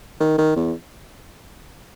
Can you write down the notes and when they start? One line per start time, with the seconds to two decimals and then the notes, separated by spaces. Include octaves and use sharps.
0.20 D#3
0.38 D#3
0.56 E2